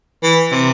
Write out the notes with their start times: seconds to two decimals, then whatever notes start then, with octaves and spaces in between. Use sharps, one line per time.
0.23 E3
0.52 C3